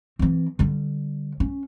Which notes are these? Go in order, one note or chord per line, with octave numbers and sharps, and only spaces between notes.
E3 C4
D3 G3
C#4